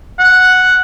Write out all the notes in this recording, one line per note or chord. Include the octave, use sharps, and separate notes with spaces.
F#5